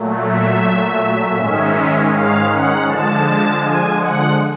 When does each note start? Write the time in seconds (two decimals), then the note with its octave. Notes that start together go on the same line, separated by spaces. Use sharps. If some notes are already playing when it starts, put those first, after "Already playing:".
Already playing: A#2 F#3 A3
0.26 E5
1.37 G#2 D#3 G#3 C#4
2.13 F5
2.50 F#5
2.87 D3 F3 G#3 A5
3.25 A5
3.61 G#5
3.99 F#5